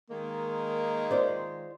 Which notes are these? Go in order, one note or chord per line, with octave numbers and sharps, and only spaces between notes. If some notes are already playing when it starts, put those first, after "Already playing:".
D#3 G#3 A#3
F4 C5 D5